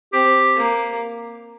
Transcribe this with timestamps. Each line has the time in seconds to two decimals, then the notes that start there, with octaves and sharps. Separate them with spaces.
0.13 C4 G4
0.56 A#3